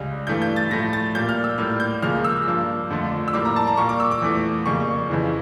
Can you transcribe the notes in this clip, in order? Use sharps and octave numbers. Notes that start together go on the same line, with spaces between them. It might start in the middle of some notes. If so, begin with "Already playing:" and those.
Already playing: C#2 C#3 G3
G2 E3 A3 G6
G6
A6
A2 F3 A3 A#6
A6
A#2 G3 A#3 G6
F6
E6
A2 G3 A#3 F6
G6
C#2 C#3 F3 A#3 F6
E6
G2 F3 A#3
F2 D3 F3 A3
E6
A2 G3 A#3 D6
A#5
A5
A#5
A#2 G3 A#3 C#6
D6
E6
D6
E2 E3 A3
F2 C#3 G3 A#3 C#6
F2 C#3 E3